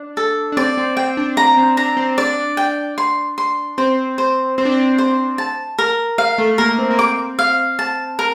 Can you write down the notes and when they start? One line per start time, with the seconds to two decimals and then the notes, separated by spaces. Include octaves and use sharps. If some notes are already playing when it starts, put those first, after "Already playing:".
Already playing: D4
0.17 A4
0.52 D4
0.57 C4 D5
0.77 C4
0.97 C4 G5
1.17 D4
1.37 D4 A#5
1.57 C4
1.77 D4 A#5
1.97 C4
2.18 D4 D5
2.57 G5
2.98 C6
3.38 C6
3.78 C4 C5
4.18 C5
4.58 C4 C5
4.65 D4
4.72 C4
4.98 C5
5.38 A5
5.79 A#4
6.18 F5
6.38 A3
6.54 A3
6.58 A#3 A#4
6.78 C4
6.91 A#3
6.99 C4 D6
7.39 F5
7.79 A5
8.19 A#4